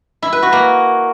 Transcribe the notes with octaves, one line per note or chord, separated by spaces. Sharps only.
E4
B4
F#4
A#3